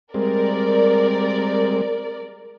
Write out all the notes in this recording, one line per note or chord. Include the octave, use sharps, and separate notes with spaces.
G3 G#3 C4 A#4 D5